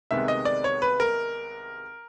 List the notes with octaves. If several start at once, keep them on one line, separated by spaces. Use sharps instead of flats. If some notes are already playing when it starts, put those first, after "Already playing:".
C2 C3 D#3 G#3 B3 E5
D#5
D5
C#5
B4
A#4